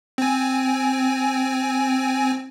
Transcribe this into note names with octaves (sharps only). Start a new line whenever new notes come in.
C4 G#5